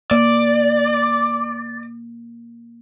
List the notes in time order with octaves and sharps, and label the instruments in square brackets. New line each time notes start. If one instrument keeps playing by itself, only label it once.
[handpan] A#3 [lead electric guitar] D5